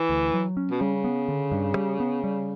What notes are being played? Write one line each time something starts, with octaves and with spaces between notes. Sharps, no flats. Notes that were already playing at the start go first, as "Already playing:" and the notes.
Already playing: E3
D2
F#3
C#4
B2
C#3 G3
B3
D3
G2
G3
B3
G3